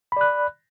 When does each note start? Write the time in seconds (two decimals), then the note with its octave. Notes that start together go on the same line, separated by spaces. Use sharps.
0.12 B5
0.17 D5
0.21 F#6